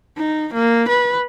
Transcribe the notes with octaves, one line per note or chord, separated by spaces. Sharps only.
D#4
A#3
B4